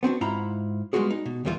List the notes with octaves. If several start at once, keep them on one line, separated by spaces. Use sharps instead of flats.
B3 C4 D4 F#4
G#2 E4 F4 F#5 A#5 B5
G3 G#3 B3 F4 F#4 G#4
D#4
B2
D#2 A#2 E3 G3 F4